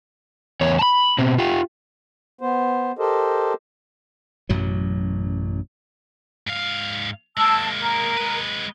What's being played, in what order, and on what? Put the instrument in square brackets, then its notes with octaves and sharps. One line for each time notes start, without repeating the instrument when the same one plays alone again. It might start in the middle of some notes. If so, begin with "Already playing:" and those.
[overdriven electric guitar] E2 C#5
A5 B5
B2 C4
F4 G4
[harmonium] B3 C5
G4 A4 A#4 C5 D#5
[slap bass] A1 F#2 B2 F#3
[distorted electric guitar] G#2 F5
[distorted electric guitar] G#3 A#3 [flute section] A5 E6
[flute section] A#4
[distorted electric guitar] G#3 B4